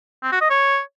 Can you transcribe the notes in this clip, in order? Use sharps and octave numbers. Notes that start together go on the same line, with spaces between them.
C4
F#4
D#5
C#5